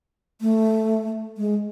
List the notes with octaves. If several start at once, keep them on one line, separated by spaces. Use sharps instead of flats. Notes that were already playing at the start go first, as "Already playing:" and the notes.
A3
G#3